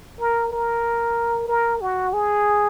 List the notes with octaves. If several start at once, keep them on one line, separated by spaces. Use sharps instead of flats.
A#4
A#4
A#4
F#4
G#4